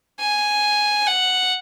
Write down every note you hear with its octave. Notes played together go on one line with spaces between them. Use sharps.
G#5
F#5